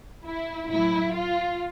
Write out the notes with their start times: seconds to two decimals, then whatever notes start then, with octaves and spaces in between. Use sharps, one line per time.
0.26 E4
0.69 A2 F#3 E4
1.13 F4